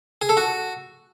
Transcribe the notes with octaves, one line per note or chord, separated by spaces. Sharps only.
G#4
A4
F#4